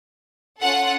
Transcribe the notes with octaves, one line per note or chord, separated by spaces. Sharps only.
C#4 F4 A4 F#5